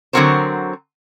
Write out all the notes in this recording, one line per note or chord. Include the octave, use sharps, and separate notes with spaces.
D3 F#3 C4 F#4 A#4 C5